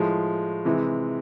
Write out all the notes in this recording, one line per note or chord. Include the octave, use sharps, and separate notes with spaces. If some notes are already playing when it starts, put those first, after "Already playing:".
Already playing: A2 F3 G#3
C3 E3 G#3